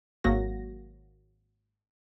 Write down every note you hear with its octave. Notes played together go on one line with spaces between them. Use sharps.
G#1 F#3 A#3 F#4 A#6